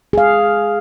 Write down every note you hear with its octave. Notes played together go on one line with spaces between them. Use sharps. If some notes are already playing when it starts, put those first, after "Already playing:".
G#4 F5